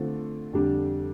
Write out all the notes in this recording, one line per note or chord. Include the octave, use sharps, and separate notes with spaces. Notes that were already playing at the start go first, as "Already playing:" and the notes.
Already playing: D3 A3 C4 F4
F2 D3 G3 D4